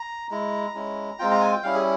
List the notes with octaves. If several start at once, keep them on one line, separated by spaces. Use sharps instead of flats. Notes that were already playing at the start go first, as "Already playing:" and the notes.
Already playing: A#5
G#3 E4 A#5
G#3 C#4 E4
G#3 C4 F4 G5
A#5
G#5
G5
G3 C#4 E4 F5
G#4